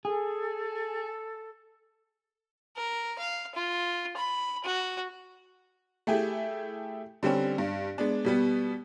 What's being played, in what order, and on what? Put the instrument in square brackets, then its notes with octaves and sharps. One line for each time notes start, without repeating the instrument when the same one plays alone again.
[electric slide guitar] G#4 [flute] A4
[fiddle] A#4
F5
F4
B5
F#4
[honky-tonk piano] A3 E4 G4 G#4
D3 G3 C4 C#4
G2
G#3 B3 D4
B2 G3 B3